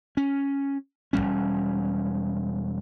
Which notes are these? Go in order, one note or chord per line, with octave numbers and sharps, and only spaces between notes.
C#4
E1 E2 G3 C#4